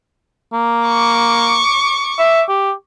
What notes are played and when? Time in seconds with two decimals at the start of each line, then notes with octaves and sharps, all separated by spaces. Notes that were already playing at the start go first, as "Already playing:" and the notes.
0.53 A#3
0.87 C#6 D6
2.19 E5
2.48 G4